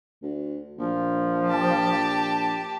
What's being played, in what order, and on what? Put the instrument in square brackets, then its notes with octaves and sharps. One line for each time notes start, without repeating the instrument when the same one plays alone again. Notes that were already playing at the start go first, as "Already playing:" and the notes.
[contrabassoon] D2
[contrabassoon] A#1 [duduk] F3
[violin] G4 A5